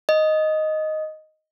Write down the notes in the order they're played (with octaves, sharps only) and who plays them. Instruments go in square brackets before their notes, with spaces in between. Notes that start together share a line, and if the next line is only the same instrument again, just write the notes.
[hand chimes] D#5